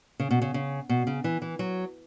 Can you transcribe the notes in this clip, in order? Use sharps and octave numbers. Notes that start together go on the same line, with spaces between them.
C#3
B2
C#3
C#3
B2
C#3
E3
E3
F#3